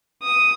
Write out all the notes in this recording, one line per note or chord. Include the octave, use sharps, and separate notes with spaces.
D#6